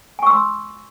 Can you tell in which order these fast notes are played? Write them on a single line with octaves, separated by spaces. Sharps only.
G#5 C#6 E6 C6